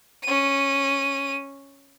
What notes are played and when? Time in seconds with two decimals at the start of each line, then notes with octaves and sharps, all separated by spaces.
0.23 C#4 D#7